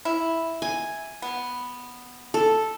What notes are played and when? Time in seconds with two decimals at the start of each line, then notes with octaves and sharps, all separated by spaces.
0.05 E4
0.62 G#5
1.22 B3
2.34 A4